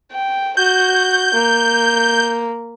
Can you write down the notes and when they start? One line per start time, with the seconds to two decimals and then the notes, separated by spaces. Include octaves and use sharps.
0.11 G5
0.57 F#4 G6
1.34 A#3